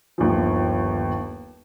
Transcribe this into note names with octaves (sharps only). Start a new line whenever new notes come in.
G1 D#2 D#3 F3